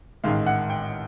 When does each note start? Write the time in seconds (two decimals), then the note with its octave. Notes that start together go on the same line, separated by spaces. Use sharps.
0.24 A1 G#2 D#3 G#3 F5
0.46 F#5
0.70 G5